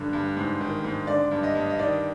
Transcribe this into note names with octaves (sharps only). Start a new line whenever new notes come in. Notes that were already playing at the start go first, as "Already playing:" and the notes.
Already playing: G2 D3
G2
G#2
D#3
G#2
D3 D5
G2
D#5
G2
D#5
D#3 D5